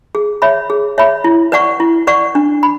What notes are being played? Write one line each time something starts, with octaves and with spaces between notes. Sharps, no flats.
G#4
C#5 E5 B5
G#4
C#5 E5 B5
E4
B4 D5 F#5 C#6
E4
B4 D5 F#5 C#6
D4
B5